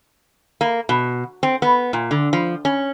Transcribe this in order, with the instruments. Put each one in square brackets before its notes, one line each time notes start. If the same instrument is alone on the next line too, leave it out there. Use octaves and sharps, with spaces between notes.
[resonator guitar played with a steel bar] A#3
B2
C4
B3
A#2
D3
F3
C#4